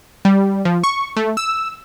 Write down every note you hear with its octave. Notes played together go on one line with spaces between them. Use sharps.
G3
F3
C#6
A3
E6